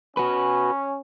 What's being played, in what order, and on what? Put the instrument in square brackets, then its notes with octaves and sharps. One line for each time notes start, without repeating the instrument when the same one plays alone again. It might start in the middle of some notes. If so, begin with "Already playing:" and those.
[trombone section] C#4 [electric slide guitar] F#4 B4